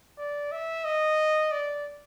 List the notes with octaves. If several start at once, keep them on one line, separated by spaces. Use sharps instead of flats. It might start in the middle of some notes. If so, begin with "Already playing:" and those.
D5
E5
D#5
D5